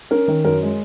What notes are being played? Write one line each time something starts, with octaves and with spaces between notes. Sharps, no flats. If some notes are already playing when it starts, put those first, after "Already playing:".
C#4 A#4
D#3
F#2 A#4
G#3